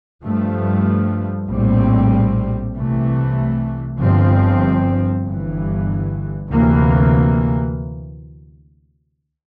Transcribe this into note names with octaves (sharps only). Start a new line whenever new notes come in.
G2 F3 A3
A#1 A2 G3 C4
C2 C3 E3 A3
G1 G2 F3 C4
G1 G2 E3
D2 C3 E3 A#3